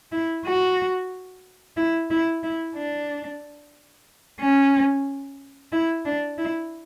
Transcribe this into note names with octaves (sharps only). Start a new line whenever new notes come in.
E4
F#4
E4
E4
E4
D4
C#4
E4
D4
E4